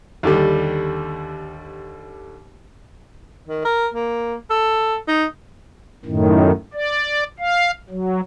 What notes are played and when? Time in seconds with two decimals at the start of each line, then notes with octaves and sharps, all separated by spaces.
0.23 D#2 D3 G3
3.48 D#3
3.65 A#4
3.94 A#3
4.50 A4
5.08 D#4
6.05 F#2 A2 D#3
6.74 D5
7.39 F5
7.89 F#3